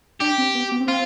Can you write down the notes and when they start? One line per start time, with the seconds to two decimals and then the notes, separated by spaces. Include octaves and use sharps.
0.21 D4 G4
0.38 C4
0.55 B3
0.72 B3
0.80 C4
0.88 F4